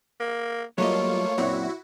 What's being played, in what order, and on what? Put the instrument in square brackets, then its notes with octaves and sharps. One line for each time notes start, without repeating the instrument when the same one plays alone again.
[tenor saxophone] A#3
[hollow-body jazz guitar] F#3 G3 D#5 [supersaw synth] A3 A#3 F4 [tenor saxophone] C#5
[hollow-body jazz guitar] F#2 A#2 C4 [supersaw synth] E4 F#4